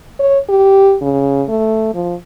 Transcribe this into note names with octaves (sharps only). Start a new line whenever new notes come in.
C#5
G4
C#3
A3
F3